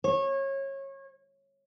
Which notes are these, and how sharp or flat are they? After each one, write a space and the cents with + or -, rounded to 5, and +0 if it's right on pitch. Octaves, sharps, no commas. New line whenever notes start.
C#5 -25